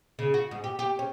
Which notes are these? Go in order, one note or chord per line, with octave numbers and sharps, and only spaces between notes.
C#3
F#4
G#2
G4
G4
C#4